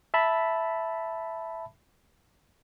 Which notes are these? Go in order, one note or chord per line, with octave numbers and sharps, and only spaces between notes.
E5 A5 B5